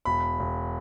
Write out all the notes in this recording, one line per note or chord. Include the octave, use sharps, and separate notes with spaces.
E1 B5
E1